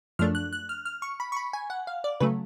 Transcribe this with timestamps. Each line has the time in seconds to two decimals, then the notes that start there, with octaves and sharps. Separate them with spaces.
0.19 F#2 F3 A3 D4 F6
0.35 F#6
0.53 F#6
0.69 F6
0.85 F6
1.02 C#6
1.20 B5
1.32 C#6
1.36 B5
1.53 G#5
1.70 F#5
1.87 F5
2.04 D5
2.20 C#3 F#3 A3 B4